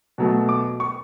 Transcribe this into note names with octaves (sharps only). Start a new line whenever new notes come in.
B2 F#3 A3
D6
C#6